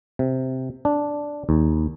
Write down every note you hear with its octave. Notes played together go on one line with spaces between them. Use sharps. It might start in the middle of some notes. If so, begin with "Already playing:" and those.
C3
D4
D#2